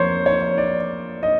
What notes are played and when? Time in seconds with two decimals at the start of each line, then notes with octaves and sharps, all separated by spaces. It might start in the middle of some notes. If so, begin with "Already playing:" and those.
Already playing: F2 F3 A#3 C5 C#5
0.26 C#5
0.58 D5
1.23 D#5